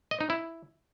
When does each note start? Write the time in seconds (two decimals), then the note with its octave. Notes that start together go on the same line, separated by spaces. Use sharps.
0.11 D#5
0.21 D#4
0.30 E4